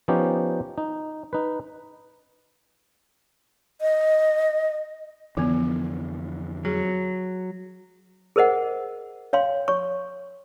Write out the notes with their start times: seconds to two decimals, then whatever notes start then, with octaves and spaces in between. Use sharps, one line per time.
0.08 F3 B3 C#4 D#4 G4
0.78 D#4
1.33 D#4 B4
3.81 D#5
5.37 F2 D3 E3 F3 B3
6.65 F#3 G#4
8.36 G#4 A#4 C5 D#5 F#5
9.33 C#5 F5 G5 C6
9.68 C#5 C#6